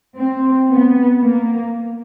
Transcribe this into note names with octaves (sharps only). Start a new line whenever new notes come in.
C4
B3
A#3